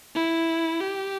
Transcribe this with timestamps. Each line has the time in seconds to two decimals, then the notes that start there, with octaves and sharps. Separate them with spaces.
0.15 E4
0.80 G4